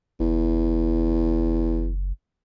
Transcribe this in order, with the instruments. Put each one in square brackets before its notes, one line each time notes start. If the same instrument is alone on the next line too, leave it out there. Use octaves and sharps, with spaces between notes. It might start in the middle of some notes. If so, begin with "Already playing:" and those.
[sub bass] F#1 [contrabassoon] E2